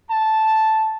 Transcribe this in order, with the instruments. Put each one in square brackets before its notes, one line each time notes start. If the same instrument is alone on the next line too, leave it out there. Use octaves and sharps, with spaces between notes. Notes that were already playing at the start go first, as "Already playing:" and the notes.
[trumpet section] A5